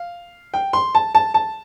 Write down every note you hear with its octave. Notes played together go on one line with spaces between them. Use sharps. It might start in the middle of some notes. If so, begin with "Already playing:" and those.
Already playing: F5
G5
C6
A5
A5
A5